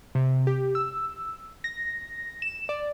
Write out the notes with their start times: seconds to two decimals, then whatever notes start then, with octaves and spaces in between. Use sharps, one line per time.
0.15 C3
0.47 G4
0.75 E6
1.64 A#6
2.42 E7
2.69 D5